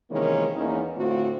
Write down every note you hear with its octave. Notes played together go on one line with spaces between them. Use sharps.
C3 D#3 E3 G#3 A#3 C#4
E2 A#3 C#4 D#4
A2 D3 A3 C4 F4 F#4